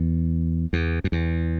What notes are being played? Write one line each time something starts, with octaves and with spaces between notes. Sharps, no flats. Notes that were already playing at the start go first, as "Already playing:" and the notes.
Already playing: E2
E2
F#2
E2